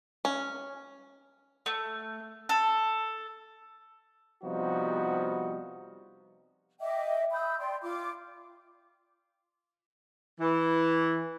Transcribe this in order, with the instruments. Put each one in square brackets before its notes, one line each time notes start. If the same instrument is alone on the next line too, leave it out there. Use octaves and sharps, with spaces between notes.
[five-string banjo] C#4
[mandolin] A3
A4
[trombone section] C3 F3 G3 B3 D#4 F#4
[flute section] D#5 E5 G5 D6
B5 D#6 E6 G6
D5 G5 C6
F4 D6
[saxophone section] E3